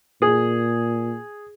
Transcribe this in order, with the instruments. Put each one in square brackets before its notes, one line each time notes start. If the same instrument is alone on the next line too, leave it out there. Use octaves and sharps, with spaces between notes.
[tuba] A#2 [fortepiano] G#4